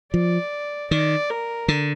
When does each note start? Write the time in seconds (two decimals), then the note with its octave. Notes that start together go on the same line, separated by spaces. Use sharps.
0.13 F3 D5
0.91 D#3 D5
1.30 A#4
1.68 D3